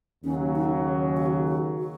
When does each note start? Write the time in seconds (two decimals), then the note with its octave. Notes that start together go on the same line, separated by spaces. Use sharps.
0.24 D#2 C#3 F#3 C#4
0.55 D#4
1.17 F#4
1.47 F#4
1.78 F#4